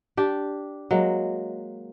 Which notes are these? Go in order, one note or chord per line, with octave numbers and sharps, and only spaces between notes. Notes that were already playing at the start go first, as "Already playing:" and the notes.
D4 G4
F#3 G#3 A#3